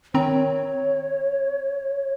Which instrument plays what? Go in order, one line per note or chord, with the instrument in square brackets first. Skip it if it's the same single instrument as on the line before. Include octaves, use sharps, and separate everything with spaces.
[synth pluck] D#3 C4 A#5 [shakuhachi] C#5